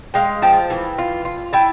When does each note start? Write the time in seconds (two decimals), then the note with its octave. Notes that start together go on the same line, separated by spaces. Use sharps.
0.14 G#3 F5 G5
0.42 F3 G5 A5
0.70 E3
0.98 F4
1.25 F4
1.53 E4 G5 A5